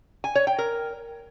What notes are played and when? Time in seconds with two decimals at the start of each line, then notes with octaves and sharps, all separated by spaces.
0.24 G#5
0.35 C#5
0.47 G5
0.59 A#4